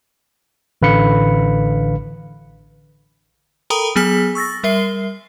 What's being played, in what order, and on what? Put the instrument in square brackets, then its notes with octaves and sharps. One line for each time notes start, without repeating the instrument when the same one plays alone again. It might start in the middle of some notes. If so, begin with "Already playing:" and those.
[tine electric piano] A1 D3 B4 F5 B5 C#7
[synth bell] A4 A#4 G5 A#5 B5 D#6
F#3 B3 G#4 G#5 F6 B6
C#6 E6 A6 A#6
G3 A#4 E5 C7 G7